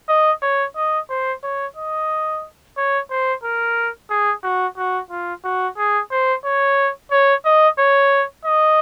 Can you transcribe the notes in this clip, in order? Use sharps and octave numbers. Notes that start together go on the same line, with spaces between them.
D#5
C#5
D#5
C5
C#5
D#5
C#5
C5
A#4
G#4
F#4
F#4
F4
F#4
G#4
C5
C#5
C#5
D#5
C#5
D#5